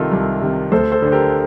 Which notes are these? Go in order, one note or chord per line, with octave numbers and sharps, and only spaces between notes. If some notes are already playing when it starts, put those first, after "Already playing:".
Already playing: C2 C3 D#3 F4 A4 A#4
C2
C3 D#3
D2 A4 C5
A4 C5
D3 C5
G4 A#4